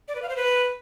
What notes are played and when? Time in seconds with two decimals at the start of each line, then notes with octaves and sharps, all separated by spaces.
0.08 D5
0.15 B4
0.22 F5
0.29 C5
0.36 B4